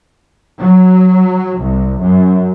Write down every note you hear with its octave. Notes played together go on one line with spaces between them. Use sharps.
F#3
C2
F#2